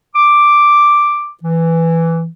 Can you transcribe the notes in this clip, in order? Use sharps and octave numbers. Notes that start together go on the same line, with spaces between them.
D6
E3